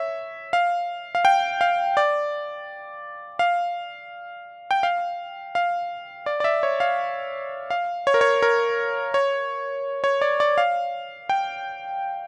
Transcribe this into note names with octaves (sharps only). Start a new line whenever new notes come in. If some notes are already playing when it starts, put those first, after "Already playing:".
Already playing: C#5 E5
F5
F5
G5
F5
D5
F5
G5
F5
F5
D5
D5
E5
C#5
F5
F5
C#5
A#4
C#5
A#4
C#5
C#5
D5
D5
F5
G5